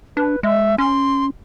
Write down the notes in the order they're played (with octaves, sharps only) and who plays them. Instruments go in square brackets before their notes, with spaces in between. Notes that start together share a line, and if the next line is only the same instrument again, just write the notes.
[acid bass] D4 [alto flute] B4
[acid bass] G#3 [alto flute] E5
[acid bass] C#4 [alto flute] C6